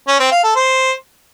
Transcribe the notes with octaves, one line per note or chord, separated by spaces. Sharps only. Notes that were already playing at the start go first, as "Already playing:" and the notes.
C#4
C4
F5
A4
C5